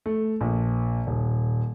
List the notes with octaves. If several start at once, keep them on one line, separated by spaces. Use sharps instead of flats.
A3
A#1
D#1